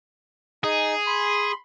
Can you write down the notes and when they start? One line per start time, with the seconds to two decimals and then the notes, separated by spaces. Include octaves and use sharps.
0.64 D#4 G#4
1.07 B5 C6